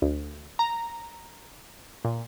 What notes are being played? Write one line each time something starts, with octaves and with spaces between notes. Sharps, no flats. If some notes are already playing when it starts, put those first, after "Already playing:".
D2
A#5
A#2